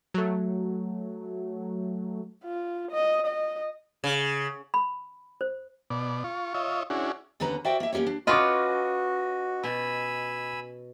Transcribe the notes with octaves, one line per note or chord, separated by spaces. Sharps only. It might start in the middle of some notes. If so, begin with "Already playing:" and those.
F#3 A3
F4
D#5
D#5
C#3
B5
C5
B2 D5
F4 C#6
F4 C#5 D#5 E5
C#4 D4 E4 F#4 G#4
D#2 D3 C#4 B4 A#5
F#4 A#4 C5 D5 E5 G5
A#3 E5
A#3 C#4 G4 A#4 C#5
D4
C#4 F4 F#4 B4 D#5 D6
B2 G#5 B5 E6